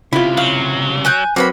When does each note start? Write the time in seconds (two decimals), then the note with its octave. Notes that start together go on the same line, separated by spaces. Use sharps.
0.13 C#2 C3 E4 F4 B5
0.37 F#3 F5
1.05 G#5 F#6 G6
1.36 F#3 A#3 C4 B4 B5